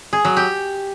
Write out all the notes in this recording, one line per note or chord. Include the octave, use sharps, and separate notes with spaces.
G#4
F#3
G4